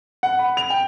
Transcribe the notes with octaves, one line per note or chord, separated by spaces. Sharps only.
F#5
B5
F7
G5